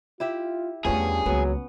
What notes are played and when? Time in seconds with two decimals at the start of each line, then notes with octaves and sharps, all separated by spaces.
0.20 E4 F4 G4 E5
0.85 E2 G2 F3 A3 B3 C#4 G#4
1.26 C#2 F#3 A#3 B3